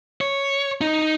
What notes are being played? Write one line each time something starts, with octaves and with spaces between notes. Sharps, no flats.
C#5
D#4